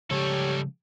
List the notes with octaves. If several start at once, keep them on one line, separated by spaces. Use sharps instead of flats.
C#3 F3 G3 G#3 G4 A4 C#5